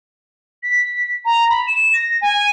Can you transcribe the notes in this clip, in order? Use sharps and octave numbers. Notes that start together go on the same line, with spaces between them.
B6
A#5
B5
E7
A#6
G#5